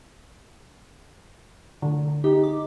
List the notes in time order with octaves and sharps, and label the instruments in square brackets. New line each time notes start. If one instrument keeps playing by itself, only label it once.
[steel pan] D3
[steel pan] D#4 [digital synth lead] G4
[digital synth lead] D6